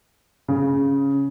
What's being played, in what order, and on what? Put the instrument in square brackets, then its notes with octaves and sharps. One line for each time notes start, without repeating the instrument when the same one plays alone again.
[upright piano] C#3